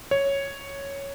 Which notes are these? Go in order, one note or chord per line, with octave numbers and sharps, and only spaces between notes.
C#5